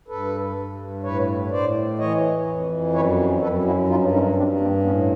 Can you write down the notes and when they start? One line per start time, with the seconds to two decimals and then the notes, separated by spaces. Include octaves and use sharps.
0.08 G2 A4 B4
0.57 G2
1.03 A2 B4 C#5
1.51 A2 C5 D5
1.99 E3 C#5 D#5
2.46 F2
2.93 F#2 B4 C#5
3.41 F#2 A4 B4
3.64 E4 F#4
3.88 G2 D#4 F4
4.12 C#4 D#4
4.35 G2 C4 D4
4.59 A#3 C4
4.83 A2 B3 C#4